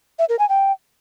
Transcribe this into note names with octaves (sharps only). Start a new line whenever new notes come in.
E5
A#4
G#5
G5